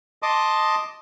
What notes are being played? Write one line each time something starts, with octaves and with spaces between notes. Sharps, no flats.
D#5 A5 C6 D6 D#6